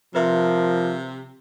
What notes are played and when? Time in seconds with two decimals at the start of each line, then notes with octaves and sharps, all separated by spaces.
0.15 C3 F3 A#4 B4 E5 C6